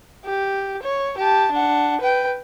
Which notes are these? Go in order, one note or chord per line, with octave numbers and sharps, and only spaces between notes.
G4
C#5
G4 A5
D4 F#5
B4 G5